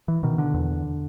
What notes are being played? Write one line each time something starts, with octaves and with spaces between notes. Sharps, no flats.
E3
B2 D#3
D3
E2